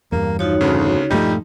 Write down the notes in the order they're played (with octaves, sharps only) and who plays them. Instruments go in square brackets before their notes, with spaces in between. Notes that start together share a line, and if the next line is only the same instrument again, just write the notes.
[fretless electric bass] E2 G2 [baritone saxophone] A#3
[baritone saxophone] F3 [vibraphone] D#4 F#4 C#5
[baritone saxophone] D2 [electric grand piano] C#3 C#4
[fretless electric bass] D#1 G2 A3 [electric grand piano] F3 D#4 [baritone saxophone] G3